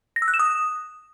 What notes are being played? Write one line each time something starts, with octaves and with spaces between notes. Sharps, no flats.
A#6
E6
F#6
E7
D#6